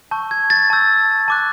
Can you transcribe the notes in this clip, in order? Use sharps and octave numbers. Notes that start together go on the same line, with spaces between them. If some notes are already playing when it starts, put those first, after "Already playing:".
A5 C#6 E6 G6
G#6
A6
A5 C#6 E6 G6
A5 D6 F#6